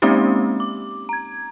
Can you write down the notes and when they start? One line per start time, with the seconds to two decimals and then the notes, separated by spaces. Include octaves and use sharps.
0.02 G#3 A#3 C4 C#4 D#4 G4
0.60 D6
1.09 A#5 G#6